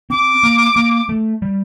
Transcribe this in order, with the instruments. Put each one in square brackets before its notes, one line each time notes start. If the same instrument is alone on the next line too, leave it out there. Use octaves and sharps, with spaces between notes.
[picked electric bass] C4 [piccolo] D6
[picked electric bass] A#3
A#3
A3
G3